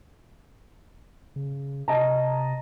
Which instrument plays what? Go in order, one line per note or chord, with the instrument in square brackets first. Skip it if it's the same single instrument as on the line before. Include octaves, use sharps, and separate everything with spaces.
[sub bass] C#3
[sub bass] C3 [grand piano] D#5 A5 A#5